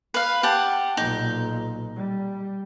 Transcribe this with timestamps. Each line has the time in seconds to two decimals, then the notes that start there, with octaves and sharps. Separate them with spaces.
0.14 B4 F5
0.43 G4 F#5 A5
0.97 B1 A#2 D#4
1.96 G3